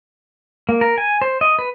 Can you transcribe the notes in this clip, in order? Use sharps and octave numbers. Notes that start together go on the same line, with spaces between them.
A#3
A#4
G#5
C5
D#5
B4